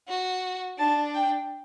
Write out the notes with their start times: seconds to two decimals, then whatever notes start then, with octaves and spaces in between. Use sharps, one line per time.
0.08 F#4
0.79 D4 A5
1.14 G5